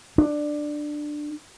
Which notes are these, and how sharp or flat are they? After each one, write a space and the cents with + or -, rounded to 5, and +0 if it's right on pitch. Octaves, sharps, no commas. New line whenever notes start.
D4 +15